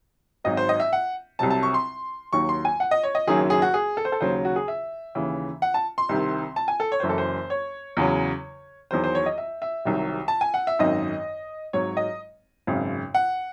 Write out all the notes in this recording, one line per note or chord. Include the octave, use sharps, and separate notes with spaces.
G#1 G#2 F#3 D#5
C5
D#5
E5
F#5
C2 C3 F#3 A5
A5
C#6
C6
D#2 D#3 F#3 C#6
C6
G#5
F#5
D#5
C#5
D#5
F#1 F#2 D#3 F#3 G#4
G#4
F#4
G#4
A4
C5
A4
D#2 C#3 F#3 C5
F#4
G#4
E5
D#2 C#3 E3
F#5
A5
C6
C2 C3 D#3
A5
G#5
A4
C#5
F#1 F#2 E3 C5
A4
C5
C#5
E2 C#3 F#3
E2 D#3 F#3 C5
C5
C#5
D#5
E5
E5
C2 C3 D#3 F#3
A5
G#5
F#5
E5
G#1 F#2 D#3 D#5
G#1 G#2 F#3 C#5
D#5
G#1 F#2 C#3
F#5